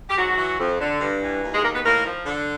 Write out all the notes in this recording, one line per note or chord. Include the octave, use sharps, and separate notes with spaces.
G4
G#2 F#3 F#4
E3
F2
D3
G2
E3
D#2
G#3 G#4
D#3 A#3 A#4
B3 B4
A2 A#3 A#4
F3
D3